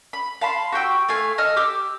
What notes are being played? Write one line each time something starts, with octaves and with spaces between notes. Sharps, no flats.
B5
F5 A5 B5 C6
F#4 G4 G5 E6
A3 F5 G#5
A4 D#5 F6
G4 D6 E6